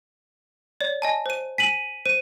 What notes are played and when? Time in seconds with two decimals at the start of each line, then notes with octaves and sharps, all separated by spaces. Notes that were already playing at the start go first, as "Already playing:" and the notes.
0.80 C#5 D5
1.02 D#5 G#5 A5
1.26 C5 D#7
1.58 G#5 B6 D#7 F#7
2.06 C5 D#7